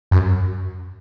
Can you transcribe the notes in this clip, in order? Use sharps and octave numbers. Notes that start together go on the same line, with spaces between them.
F#2